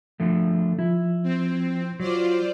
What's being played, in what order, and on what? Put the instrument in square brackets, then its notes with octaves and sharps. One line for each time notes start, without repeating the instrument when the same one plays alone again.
[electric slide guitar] D3 F3 A3
[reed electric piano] F3 [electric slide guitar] E4
[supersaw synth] C4
[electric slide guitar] F#3 [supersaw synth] F4 C5 D5